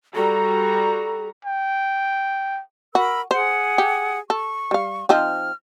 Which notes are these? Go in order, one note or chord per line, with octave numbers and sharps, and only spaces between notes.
G3 F#4 A4 A#5
G5
F#4 A#4 B5 E6
G#4 C5 F#5
G4
A4 C#6
G3 F5
F3 C4 D#4 F6